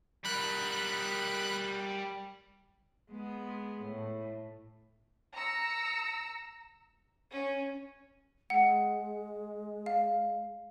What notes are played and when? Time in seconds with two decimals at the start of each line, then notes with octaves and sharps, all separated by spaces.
0.25 G3 A#4 B5 F#6
3.10 G#3 B3
3.82 A2
5.34 A#5 E6 C#7
7.30 C#4
8.50 G#3 F#5
9.86 F5